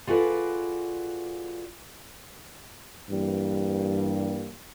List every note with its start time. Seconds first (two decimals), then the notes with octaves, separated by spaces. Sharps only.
0.07 F4 F#4 G#4 A4 B4 D5
3.09 G2 E3 G3 A#3